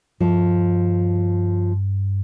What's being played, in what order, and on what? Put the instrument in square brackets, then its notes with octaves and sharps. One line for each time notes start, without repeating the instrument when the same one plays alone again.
[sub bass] G2 [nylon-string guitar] F3